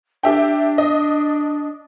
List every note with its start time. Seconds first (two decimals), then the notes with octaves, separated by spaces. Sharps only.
0.23 D4 G4 E5 G5
0.78 D#5